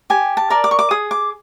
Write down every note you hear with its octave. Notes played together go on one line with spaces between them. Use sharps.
G4 G#5
A5
A#4 D5
D6
C#6
D6
G#4 D#6
D6